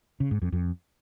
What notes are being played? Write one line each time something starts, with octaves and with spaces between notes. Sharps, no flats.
C#3
G#2
F2
F2